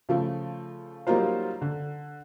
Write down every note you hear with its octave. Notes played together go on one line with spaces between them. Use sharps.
C#3 F3 A3
F#3 G3 A#3 D#4 F4 C5
D3